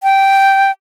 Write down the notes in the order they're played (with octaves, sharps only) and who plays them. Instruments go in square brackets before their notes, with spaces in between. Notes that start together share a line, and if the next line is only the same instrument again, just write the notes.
[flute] G5